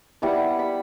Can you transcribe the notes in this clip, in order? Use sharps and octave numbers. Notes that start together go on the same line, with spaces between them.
G3 B3 E4 F#5
B5